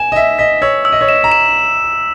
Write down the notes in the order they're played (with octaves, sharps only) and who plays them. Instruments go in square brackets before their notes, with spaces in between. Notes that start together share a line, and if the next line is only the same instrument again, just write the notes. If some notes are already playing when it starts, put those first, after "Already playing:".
Already playing: [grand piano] G#5 [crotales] E7
[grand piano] D#5
[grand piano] E5 [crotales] B6
[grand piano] D#5 [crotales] B6
[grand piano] C#5 [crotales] E6
[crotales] E6
[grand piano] D#5
C#5
[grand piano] D#5 [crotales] E7
[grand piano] A#5
[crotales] E7